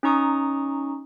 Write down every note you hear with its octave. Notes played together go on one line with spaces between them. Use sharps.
C#4 D#4 A#5 C#6 D#6